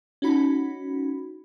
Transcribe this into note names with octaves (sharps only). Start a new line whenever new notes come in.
C#4 D#4 F#4 B5